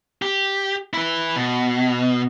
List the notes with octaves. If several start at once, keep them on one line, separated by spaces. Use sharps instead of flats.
G4
E4 B4
B2